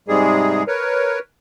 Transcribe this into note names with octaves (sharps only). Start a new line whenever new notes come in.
G#2 C3 G3 G#3 G#4
A#4 B4 C#5